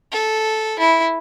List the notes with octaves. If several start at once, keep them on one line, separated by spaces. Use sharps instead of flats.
A4
E4